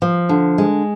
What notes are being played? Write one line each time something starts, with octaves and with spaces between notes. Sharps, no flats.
F3
D3
G#3